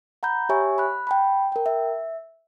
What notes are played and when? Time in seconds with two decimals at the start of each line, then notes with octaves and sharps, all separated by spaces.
0.23 F#5 A#5 B5 G6
0.49 G4 C#5 E5 G#5 C#6
0.78 B5 F#6
1.07 G5 A5 B5
1.52 A#4 G5
1.66 E5